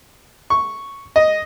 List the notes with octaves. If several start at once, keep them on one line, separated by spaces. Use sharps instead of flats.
C#6
D#5